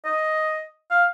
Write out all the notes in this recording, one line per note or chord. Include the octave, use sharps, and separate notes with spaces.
D#5
F5